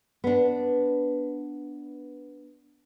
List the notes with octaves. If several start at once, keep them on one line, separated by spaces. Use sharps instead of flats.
B3 D4